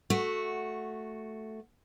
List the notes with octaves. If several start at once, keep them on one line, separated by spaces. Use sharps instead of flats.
A3 F#4